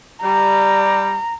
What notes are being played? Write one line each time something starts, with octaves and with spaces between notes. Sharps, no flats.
G3 A#5